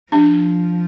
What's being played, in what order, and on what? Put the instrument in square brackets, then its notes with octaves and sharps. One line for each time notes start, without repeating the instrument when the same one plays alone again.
[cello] F3 [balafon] D4